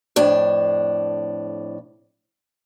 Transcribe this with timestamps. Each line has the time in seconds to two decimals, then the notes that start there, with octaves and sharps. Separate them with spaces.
0.16 F2 A2 D4